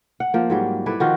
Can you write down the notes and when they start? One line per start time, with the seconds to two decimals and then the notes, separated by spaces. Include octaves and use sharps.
0.20 F#5
0.34 F3 A#3
0.50 G#2 F#3 G3
0.86 E4 A4 B4 D5
1.00 D#3 F3 F4 F#4